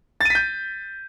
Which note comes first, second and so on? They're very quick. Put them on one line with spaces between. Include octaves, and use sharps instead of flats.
A6 D#7 B6 G6